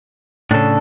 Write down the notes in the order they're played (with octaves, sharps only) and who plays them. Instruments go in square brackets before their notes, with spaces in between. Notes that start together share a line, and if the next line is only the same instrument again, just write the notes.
[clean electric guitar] A2 C#3 [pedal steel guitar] D4 A4